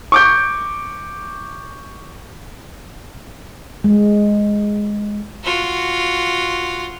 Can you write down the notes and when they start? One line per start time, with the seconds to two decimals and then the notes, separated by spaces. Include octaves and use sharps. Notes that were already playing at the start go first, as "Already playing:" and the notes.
0.12 C#6 D6 G6
3.84 G#3
5.43 F4 F#4